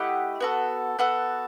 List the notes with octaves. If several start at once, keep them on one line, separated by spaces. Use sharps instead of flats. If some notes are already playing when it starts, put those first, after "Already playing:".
Already playing: A3 E4 G4 D#5 F#5
B3 F#4 A4
B3 F#4 A4